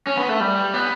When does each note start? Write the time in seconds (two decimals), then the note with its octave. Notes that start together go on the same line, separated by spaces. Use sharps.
0.07 C#4
0.17 B3
0.29 A3
0.40 G3
0.74 B3